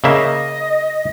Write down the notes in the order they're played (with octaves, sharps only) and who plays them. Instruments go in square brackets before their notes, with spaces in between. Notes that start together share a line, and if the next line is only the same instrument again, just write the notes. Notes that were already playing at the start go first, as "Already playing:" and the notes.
[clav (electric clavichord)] C#3 A#3 E5 [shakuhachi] D#5